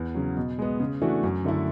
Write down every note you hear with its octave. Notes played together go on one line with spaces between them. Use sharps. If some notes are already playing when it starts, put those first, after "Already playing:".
Already playing: E2
C#3 F#3
B2
G#3 B3
C#3
E3 A3 D4 F#4
F#2
D3 A3 E4